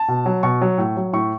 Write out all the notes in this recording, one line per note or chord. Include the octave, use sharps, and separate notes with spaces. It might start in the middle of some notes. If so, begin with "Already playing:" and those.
Already playing: A5
B2
F#3
B2 C#6
F#3
A2
F#3
A2 C#6